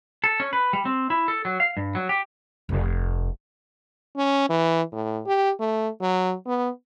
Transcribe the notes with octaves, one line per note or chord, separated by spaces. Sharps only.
A4
C#4
B4
G3
C4
E4
A4
F#3
F5
G2
F#3
G4
F1
C#4
E3
A2
G4
A3
F#3
B3